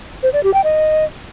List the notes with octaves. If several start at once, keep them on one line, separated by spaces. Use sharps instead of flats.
C5
D5
G4
G5
D#5